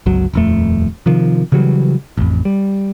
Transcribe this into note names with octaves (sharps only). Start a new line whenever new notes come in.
G1 C#2 F#3
D#1 F2 A3
C3 D#3 F3
C#3 E3 F#3 G3
A1 F2
G3